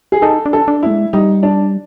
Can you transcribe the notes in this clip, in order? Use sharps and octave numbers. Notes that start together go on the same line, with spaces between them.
G#4
D#4 A4
D4
A4
D4
A3 E4
G#3
G3 D#4
D4